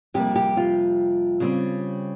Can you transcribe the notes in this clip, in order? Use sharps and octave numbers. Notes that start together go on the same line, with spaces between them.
F2 C3 G3 A#3 G4
G4
F4
C#3 G3 C4